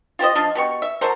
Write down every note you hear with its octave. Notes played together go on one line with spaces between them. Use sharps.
F4 G4 C5 D#5
F3 D4 D#5 F5
B2 G4 C#6
E5
F#3 A4 A#4 C5